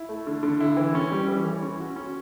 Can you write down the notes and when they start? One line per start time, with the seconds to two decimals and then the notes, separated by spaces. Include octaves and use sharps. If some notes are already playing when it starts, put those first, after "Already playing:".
Already playing: E4
0.09 A3
0.27 D3
0.43 D3
0.60 E4
0.77 E3
0.95 C#4
1.12 G3
1.28 E3
1.45 E3
1.62 C#4
1.80 F#4
1.96 C#4